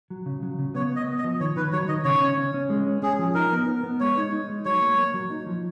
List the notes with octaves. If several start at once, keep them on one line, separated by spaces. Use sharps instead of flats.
F#3
C#3
F#3
C#3
B3 C#5
B3 D#5
B3
D#5
F3
D#3 C#5
D#3 B4
F#3 C#5
D#3 D#5
C#3 C#5
C#4
C#4
C#4
G#3
C#4
C#4 G#4
F3
D#4 A#4
B3
B3
B3
G#3 C#5
D#4
D#4
G#3
F#3 C#5
A#3
A#3
F#3
D#4
F3